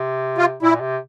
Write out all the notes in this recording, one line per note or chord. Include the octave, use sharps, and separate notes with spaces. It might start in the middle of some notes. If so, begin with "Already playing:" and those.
Already playing: C3
F4
A#2 E4
C3